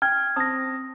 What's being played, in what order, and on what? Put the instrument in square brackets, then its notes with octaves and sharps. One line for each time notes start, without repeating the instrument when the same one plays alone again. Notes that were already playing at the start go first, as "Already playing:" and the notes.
[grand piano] G5 [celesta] F6 G#6
[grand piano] C4 A5 [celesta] D#6 A#6